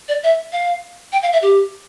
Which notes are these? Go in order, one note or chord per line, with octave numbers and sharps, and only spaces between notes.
D5
E5
F5
G5
F5
E5
G4